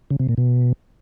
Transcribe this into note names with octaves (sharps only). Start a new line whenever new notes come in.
C#3
C3
A#2
B2